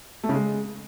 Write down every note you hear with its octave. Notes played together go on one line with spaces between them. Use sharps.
A3
C#3
G#3